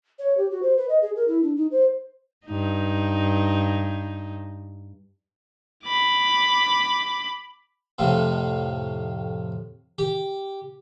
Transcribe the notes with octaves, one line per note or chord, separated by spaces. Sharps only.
C#5
G4
F#4
C5
B4
D#5
G#4
A#4
E4
D4
D#4
C5
G2 D#4
B5 D6
F2 A2 C3
G4